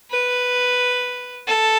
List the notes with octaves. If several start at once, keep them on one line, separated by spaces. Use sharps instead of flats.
B4
A4